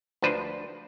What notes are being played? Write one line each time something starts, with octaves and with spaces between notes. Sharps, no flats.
D2 F3 D4 B4 C5